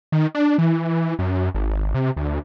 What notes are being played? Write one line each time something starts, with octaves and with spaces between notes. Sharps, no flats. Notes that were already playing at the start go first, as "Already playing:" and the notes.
D#3
D4
E3
F#2
G#1
C3
D2